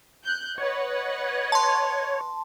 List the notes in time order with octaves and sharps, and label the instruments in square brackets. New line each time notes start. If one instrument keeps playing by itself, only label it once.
[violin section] F#6 G6
[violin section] B4 D#5 F#5 [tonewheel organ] C#5
[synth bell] A5 C6